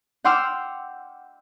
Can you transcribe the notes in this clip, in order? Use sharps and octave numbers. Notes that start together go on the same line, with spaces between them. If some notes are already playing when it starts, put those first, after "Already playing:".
F#5 G5 C6 D6 E6 F6